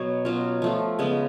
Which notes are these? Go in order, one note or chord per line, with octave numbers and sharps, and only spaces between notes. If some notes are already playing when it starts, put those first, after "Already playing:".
Already playing: B2 F#3 B3 C#5
B2 F#3 C#4 F4
F3 A3 F4
C#3 G#3 B3